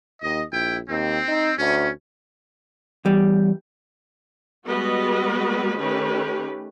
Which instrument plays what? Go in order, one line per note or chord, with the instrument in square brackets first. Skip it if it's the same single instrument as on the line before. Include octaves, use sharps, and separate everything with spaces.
[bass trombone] D#2 [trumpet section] D#5
[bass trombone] A#1 [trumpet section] E4 G5
[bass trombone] D#2 [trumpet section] C4
[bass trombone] D#4
[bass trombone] D2 [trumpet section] C#4
[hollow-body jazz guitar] E2 G3
[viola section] G3 G#3 B3 F#4 B4 D#5
D#3 A3 C#4 G4 B4